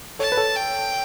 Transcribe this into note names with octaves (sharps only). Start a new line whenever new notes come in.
A4 C#5 A5
B4
A4 C#5
G5